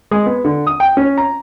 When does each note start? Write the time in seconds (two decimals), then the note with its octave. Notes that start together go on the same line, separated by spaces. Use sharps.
0.11 G#3
0.26 B3
0.45 D3
0.67 D#6
0.80 G5
0.97 C#4
1.17 A#5